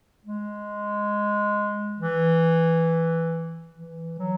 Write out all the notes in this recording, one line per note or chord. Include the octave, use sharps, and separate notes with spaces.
G#3
E3
E3
F#3